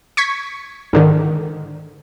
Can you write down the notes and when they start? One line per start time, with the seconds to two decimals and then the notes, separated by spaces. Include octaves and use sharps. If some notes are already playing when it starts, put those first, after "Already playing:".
0.17 C#6 G#6 B6
0.93 G#2 D3 D#3